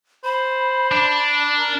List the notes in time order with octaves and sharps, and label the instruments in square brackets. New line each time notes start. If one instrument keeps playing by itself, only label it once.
[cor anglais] C5 [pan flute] B5
[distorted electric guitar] D4
[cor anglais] A#4